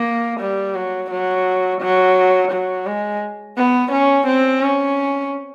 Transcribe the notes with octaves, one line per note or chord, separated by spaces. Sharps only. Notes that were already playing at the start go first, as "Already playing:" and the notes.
Already playing: A#3
G3
F#3
F#3
F#3
F#3
G#3
B3
C#4
C4
C#4